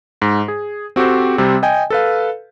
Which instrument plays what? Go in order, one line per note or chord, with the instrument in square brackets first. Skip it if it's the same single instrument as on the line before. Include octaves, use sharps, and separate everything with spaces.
[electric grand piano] G#2
G#4
C4 F#4 G4 A4 C5
C3 G3 C4
D#5 G5 G#5
A4 B4 F5